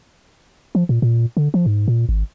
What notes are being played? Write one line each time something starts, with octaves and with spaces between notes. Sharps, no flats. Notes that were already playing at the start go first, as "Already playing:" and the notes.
F3
A#2
A#2
D3
F3
G#2
A#2
G#1